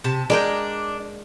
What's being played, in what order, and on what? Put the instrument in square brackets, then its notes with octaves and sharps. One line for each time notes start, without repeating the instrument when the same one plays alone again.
[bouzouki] C3 A5
[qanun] G#3 A#4 G5 [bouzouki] D4